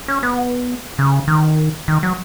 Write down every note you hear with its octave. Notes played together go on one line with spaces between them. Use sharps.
C#4
B3
C#3
D#3
D#3
F#3